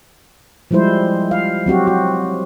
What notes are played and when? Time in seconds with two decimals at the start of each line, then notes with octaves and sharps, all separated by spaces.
0.71 F3 G3 G#3 E4 C5
1.31 F5
1.66 F#3 C4 F#4 G4
1.87 F#4